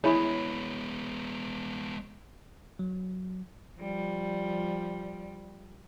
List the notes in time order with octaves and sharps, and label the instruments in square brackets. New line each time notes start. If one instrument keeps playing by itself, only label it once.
[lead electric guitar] G#3 B3 [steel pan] E4 G#4 [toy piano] C#5 B5
[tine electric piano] F#3
[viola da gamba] F3 G3